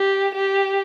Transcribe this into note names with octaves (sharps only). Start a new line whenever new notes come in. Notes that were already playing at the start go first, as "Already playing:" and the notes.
Already playing: G4
G4